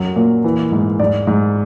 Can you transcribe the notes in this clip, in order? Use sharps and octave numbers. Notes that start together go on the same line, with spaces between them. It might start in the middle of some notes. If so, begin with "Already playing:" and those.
Already playing: F#2 F#3
A#2
E3
G#2
G#2 D5
G#2